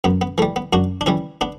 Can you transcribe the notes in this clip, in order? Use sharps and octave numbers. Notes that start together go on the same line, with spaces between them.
F#2 B3
B3
E3 G3 A3
B3
F#2 D4 F#4
D4
E3 G3 C#4 E4
B3 D4